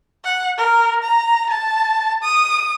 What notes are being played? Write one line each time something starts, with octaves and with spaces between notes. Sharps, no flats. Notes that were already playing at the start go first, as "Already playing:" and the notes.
F#5
A#4
A#5
A5
D#6